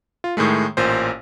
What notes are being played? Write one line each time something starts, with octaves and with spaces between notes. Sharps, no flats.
F4
A2 D#3 G#3 A3
A1 A#2 C5